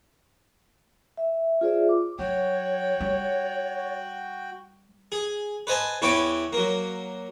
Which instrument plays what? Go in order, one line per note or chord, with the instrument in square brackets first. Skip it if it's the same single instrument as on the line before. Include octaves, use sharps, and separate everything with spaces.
[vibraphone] E5
F4 G#4 C5 D5 E5
D6
[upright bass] F#3 [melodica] F#4 G5 [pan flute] C#5
[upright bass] G3
[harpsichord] G#4
B4 C5 D#5 G#5 A5
E2 E4 B4 C#5 G5 D6
F#3 A#3